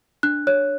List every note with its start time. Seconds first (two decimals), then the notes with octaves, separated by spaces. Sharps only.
0.23 D4 F#6
0.47 C#5 F#6